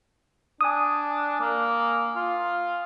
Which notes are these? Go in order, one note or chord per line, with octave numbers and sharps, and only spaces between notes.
D4 G#5 D#6
A#3
F4